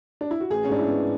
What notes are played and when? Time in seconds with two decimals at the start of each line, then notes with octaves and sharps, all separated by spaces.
0.21 D4
0.31 E4
0.40 F#4
0.50 A1 G#4
0.64 C#4
0.69 G#2 D4
0.79 E4
0.87 B3